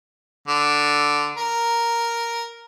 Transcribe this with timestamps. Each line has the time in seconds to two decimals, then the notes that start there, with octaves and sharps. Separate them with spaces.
0.48 D3
1.38 A#4